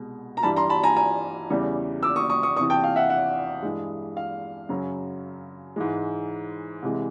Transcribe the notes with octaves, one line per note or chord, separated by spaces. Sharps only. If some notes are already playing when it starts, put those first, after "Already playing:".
Already playing: C2 B2 G#3
A#5
G2 E3 G3 A5 B5
A#5 C6
A5 B5
G#5 A#5
G#5 A#5
E2 C#3 E3 G3
D6 E6
C#6 D#6
C#6 D#6
C#6 D#6
E2 C3 E3 C#6 D#6
G5 A5
F5 G5
E5 F#5
E5 F#5
G2 E3 G#3
F5
F#2 C#3 F#3
G#2 E3 G#3
C2 C3 E3 G#3